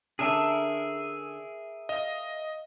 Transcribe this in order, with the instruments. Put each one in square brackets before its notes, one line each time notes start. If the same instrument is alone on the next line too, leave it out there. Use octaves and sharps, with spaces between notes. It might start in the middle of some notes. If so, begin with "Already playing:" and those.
[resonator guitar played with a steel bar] D3 C#4 D4 [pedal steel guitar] G#4 A#4 E5
[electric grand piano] D#5 [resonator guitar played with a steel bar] F5